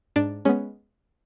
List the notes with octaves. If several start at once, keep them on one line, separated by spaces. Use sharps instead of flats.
G#2 D4
G#3 B3 C#4